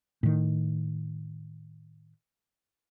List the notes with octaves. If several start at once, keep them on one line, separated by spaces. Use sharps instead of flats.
A2 D#3